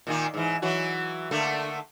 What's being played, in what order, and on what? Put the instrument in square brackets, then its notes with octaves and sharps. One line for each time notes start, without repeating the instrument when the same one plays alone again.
[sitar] A#2 D#3 A#3
G#2 E3
E3 F#3 F#4
D3 A3 A#3